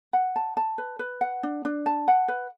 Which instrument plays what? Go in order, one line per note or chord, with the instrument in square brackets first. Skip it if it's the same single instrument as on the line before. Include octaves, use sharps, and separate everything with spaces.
[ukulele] F#5
A5
A5
B4
B4
F#5
D4
D4
A5
F#5
B4